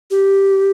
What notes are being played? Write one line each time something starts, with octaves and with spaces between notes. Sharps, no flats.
G4